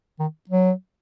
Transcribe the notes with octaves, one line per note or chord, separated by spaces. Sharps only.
D#3
F#3